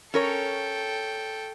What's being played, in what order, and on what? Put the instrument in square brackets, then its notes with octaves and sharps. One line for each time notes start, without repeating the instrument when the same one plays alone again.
[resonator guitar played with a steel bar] C#4 A#4 C#5 [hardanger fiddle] A4 G5